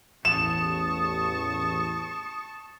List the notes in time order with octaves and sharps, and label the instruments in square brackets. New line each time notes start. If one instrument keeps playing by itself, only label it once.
[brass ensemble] A1 E2 [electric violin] A5 C#6 [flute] D#6 [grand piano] E7